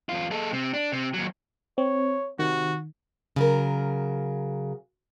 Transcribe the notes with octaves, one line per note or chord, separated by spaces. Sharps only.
E2 F4
G#3 A4
C3
D4
C3
D#2 F#3
C4 C#5
C3 D#3 F#4
C#3 F#3 A#4